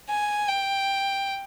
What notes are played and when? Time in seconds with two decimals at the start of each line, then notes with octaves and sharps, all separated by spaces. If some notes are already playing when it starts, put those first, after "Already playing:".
0.10 G#5
0.48 G5